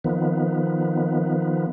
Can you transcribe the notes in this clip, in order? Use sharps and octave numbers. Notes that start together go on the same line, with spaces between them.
D#3 F3 B3